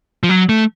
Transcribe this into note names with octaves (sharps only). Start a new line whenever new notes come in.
F3
F#3
A3